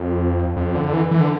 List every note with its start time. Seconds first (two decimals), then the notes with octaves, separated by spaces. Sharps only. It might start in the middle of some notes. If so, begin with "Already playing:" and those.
Already playing: F2
0.56 F2
0.75 D3
0.93 E3
1.11 E3
1.21 D3